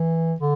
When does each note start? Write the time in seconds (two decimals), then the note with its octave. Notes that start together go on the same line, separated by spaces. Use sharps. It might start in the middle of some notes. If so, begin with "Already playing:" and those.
Already playing: E3
0.40 D3